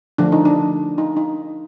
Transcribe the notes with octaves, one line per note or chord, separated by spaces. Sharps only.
D3 F3 A3 D4
D#4
D4
D#4
D#4